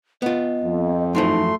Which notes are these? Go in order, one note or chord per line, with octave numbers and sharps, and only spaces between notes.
B3 F4 D#5
F2
F#2 E3 F3 A3 D#4 C6